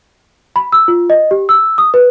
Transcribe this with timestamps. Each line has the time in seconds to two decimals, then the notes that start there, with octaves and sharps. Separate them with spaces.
0.56 B5
0.72 E6
0.88 F4
1.10 D#5
1.31 G4
1.49 E6
1.78 D#6
1.94 B4